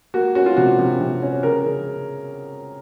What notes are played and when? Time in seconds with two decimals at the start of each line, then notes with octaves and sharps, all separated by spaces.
0.14 A#3 F#4
0.35 C#4 F#4
0.46 F4
0.57 C3 F#4
0.79 C3
1.01 C3
1.22 C#4
1.43 C#3 A#4
1.65 C#3